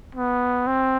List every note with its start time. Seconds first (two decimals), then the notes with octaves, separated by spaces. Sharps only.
0.15 B3
0.67 C4